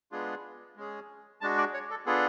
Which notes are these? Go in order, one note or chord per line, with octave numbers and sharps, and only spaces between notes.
G#3 B3 D4 F4 G#4
G#3 C#4 G#4
G#3 D4 F#4 A5
D5
C#5
A4
B3 D4 F4 G#4 A4